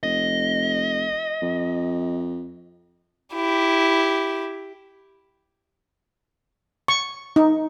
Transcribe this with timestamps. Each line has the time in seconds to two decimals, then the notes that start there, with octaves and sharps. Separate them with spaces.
0.03 F1 D#5
1.42 F2
3.35 E4 G4
6.88 C#6
7.36 D#4